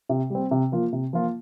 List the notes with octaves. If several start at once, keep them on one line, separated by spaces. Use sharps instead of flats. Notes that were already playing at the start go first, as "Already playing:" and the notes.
C3
G3 C4
C3
F3 A#3 F4
C3
F3 A#3 F4